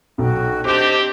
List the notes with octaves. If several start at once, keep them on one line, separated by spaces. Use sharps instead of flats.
B1 B2 F#4 G5
C4 D4 G4 C5 D#5 D6 G6